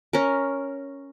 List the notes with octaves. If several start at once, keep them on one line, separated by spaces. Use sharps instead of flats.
C#4 A#4